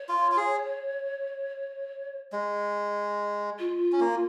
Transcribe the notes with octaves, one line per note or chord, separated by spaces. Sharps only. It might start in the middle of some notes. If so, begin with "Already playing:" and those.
Already playing: C#5
F4
F4
G#4
G#3
F4
C#4
A#3